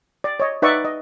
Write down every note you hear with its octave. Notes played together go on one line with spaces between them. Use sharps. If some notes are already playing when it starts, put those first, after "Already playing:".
D5
C#5 D#5
D#4 B4 D5 E5 F#5 C#6
D#5